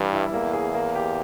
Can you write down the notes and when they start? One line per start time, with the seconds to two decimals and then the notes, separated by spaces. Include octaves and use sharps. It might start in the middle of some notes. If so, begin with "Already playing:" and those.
Already playing: G2 E3 G3
0.13 E4
0.33 E2 A#3
0.53 G#4
0.75 A#3
0.95 G4